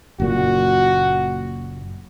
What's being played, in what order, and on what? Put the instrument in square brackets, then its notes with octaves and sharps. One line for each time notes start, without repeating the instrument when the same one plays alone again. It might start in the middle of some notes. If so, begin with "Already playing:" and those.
[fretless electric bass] F#1 A#2 [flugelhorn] F#4